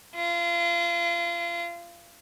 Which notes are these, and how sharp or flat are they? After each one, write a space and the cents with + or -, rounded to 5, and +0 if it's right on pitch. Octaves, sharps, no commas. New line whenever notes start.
F4 -30